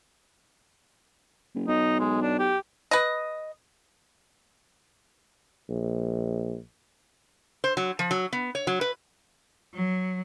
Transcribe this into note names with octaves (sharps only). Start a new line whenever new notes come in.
F#1
B1 D#4
G#3
D4
G4
B4 D#5
A#1
C5
F#3
F3
F#3
B3
C#5
F#3
B4
F#3